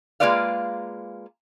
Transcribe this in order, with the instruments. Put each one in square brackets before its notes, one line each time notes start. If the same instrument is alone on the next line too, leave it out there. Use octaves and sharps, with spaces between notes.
[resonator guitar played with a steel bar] G#3 A#3 F4 B4 D5 F5